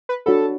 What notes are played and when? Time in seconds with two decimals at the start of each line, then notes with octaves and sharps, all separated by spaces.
0.09 B4
0.26 D4 F#4 A4 C#5 F#5 B5